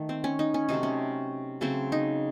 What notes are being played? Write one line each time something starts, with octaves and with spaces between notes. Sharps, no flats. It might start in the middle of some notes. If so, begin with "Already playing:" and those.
Already playing: D#3 A3
C4
C#4
D#4
C#4
C3 F#3 A3 D#4
C#4
C#3 F#3 A3 C4
D#4